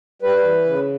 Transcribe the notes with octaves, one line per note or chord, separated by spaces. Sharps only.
G3 B4
E3
C#3